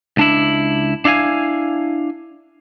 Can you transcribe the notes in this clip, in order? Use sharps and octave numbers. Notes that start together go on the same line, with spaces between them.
C#2 D4 E4
D4 E4 F5 G#5